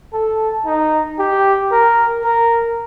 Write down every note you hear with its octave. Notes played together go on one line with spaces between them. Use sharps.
A4
D#4
G4
A#4
A#4